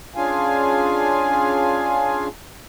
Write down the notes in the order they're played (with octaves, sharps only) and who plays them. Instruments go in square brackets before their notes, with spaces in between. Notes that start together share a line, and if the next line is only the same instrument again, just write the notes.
[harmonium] C#4 D4 F4 G#4 F5 G#5